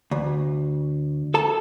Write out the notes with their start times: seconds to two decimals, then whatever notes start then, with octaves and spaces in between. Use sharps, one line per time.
0.11 D2
1.34 A4 A5